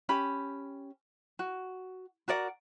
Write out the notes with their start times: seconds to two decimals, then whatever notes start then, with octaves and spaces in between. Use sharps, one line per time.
0.09 C#4 G4 B5
1.39 F#4
2.28 F#4 A#4 D5 F#5